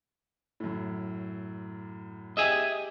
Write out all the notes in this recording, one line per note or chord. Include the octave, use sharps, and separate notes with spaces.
F#2 A2
G4 G#4 D#5 E5 G#5